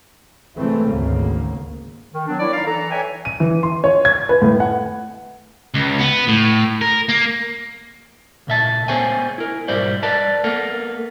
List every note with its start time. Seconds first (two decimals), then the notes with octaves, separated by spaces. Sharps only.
0.57 C3 E3 G#3 A3 C4
0.88 G#1 D2 C#3 A#3
2.14 D#3
2.28 F#3 B3 D4
2.40 E4 C#5 D5
2.54 D#4 A#4 F5
2.67 E3 A4 A#5
2.90 B4 C#5 D5 E5 G5 G#5
3.25 D#7
3.40 E3
3.63 C6
3.84 C#5
4.05 G#6
4.29 B4
4.42 A2
4.60 F#5
5.75 C#2
5.99 B3
6.28 A2
6.82 A#4
7.09 A#3
8.47 C#2 A#2 E5 A5
8.88 B3 G#4 C5 C#5 G5 G#5
9.38 E4 A#4
9.68 B1 G#2 G3 E4 C5 D5
10.03 A#4 B4 D5 A5
10.44 A#3 B3 A4 A#4